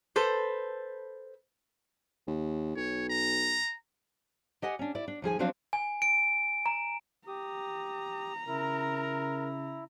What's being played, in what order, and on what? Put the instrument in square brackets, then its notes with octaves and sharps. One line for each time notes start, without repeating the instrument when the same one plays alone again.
[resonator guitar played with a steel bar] A4 B4 C5
[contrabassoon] D#2
[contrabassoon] B1 [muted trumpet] C#5
[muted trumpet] A#5
[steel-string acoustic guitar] G4 D#5 F#5 G#5
C#4 D4
E4 D5
D4
D#2 F3 G#4 G#5
F3 F#3 C4 D4 F#4 F5
[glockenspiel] G#5
D7
A#5
[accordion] G4 D#6 [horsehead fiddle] A#5
[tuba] C#3 [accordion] E4 [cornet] A#4